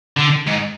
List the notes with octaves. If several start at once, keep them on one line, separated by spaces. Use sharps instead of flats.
D3
G#2